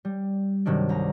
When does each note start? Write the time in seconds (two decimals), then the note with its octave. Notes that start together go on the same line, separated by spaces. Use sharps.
0.05 G3
0.66 G2 C3 D#3 F#3 D4
0.89 C2 A#5